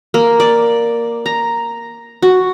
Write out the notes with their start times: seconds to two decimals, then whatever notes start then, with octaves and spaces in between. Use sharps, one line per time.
0.14 A#3
0.40 D5
1.26 A#5
2.22 F#4